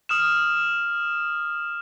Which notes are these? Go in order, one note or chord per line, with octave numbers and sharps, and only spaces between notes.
D#6 F6 E7